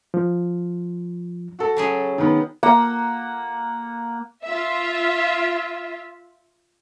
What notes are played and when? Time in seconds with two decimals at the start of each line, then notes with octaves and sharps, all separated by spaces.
0.14 F3
1.59 F#4 A4
1.77 C#3 F#3 G#4
2.18 D#3 B3
2.63 A#3 F#5
4.44 F4 E5